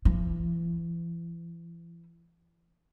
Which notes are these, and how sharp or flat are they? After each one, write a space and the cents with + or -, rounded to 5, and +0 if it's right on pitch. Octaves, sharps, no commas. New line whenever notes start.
E3 +40